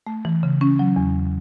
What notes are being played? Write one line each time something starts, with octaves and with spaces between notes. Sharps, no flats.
A3
E3
C#3
C#4
F#3
E2